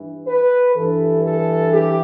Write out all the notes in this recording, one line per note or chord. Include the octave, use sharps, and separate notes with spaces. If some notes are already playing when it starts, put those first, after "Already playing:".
Already playing: G2 E3
B4
G2 E3 A4
A4
G4